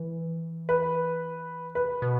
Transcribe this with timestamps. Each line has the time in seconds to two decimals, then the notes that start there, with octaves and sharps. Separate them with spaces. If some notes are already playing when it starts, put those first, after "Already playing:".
Already playing: E3
0.69 B4
1.75 C3 B4
2.02 B2